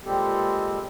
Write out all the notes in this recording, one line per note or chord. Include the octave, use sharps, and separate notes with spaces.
A#2 G3 G#3 C4 G4 A4